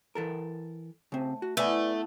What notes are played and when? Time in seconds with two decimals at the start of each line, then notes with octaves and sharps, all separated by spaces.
0.15 E3 A4 A#4
1.12 C#3 A3 C4
1.42 F#4
1.57 A3 B3 E4 B4 D5 G#5